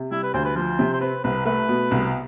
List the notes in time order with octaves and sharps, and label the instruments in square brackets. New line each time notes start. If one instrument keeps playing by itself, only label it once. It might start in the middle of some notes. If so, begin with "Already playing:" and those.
Already playing: [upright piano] C3
[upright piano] G3 [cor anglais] E4
[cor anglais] B4
[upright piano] D2 [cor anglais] C5
[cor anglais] B4
[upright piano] F3 [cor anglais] C5
[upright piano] C3
[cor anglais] C5
[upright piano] C4 [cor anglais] B4
[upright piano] C2 [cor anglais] B4
[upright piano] A3 [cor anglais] B4
[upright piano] B2
C2